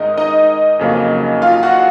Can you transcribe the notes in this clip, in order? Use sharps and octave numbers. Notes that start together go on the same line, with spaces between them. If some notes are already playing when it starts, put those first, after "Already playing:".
Already playing: G#2 D#3 G#3 D#4 D#5
D#4 D#5
F2 C#3 F#3 A#3
F4 F5
F#4 F#5